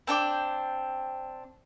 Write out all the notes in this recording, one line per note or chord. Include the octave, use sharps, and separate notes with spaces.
C4 D4 G5 D6